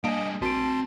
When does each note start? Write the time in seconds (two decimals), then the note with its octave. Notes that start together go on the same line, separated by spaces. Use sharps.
0.04 G3 A#3 D4 G#4 D#5 D7
0.42 A#1 C4 F#4 G#5 A5 C6 D7